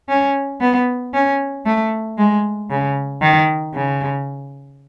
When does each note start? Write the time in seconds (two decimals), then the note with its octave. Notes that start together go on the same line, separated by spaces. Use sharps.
0.09 C#4
0.61 B3
1.14 C#4
1.66 A3
2.18 G#3
2.70 C#3
3.22 D#3
3.74 C#3